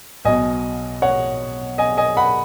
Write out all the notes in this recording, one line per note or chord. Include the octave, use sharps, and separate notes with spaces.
B1 B2 D#5 G#5
C#5 F#5
D#5 G#5
D#5 G#5
F#5 B5